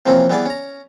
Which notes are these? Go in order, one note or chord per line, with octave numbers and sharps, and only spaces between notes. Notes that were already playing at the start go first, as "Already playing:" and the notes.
C3 E3 F3 A#3 C4 C#4
E3 G3 B3 G#4 D5
C#4 A#5